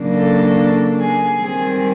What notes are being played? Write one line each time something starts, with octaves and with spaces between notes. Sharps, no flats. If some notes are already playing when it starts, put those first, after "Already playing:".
Already playing: C#3 F#3 A#3 D4
A4
G#4
D#3 G3 C4 G#4